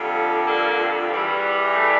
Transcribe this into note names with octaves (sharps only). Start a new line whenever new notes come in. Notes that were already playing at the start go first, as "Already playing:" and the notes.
Already playing: F2 D3 G3
A#3
E2 E3 G3
A3